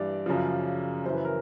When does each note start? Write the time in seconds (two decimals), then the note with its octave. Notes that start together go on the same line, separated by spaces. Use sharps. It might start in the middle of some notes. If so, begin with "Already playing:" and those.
Already playing: G2 E3 D5
0.26 F#2 C#3 F3
1.05 F#2 C#3 E3 C5
1.14 B4
1.25 A#4